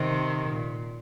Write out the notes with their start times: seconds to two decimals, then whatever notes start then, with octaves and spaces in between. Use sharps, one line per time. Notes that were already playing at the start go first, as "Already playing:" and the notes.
Already playing: C3 D#3
0.50 A#2